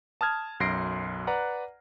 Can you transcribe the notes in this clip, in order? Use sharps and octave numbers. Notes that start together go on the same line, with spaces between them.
A5 D#6 F6 G#6
B1 F#2 C6 A#6 C7 D7
B4 D5 F#5 A#5